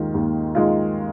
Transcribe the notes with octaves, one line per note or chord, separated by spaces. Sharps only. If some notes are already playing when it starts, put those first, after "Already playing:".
Already playing: D#2 D#3 G#3 F4
D#2
D#3 G#3 F4